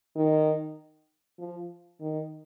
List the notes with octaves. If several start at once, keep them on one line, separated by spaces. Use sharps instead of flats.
D#3
F3
D#3